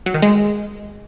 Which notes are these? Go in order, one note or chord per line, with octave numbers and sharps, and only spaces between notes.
F#3
D#3
G#3